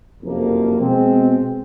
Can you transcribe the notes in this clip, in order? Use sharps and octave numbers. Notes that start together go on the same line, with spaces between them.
F#1 F2 C3 F3 A#3
B2 G#3 C4